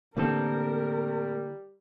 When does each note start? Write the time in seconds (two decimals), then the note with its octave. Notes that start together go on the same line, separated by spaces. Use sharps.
0.17 A2 D3 E3 G3 A#3 C4 A4 A#4